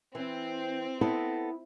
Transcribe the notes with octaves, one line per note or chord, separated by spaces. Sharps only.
E3 C4
B3 E4 A4 D#5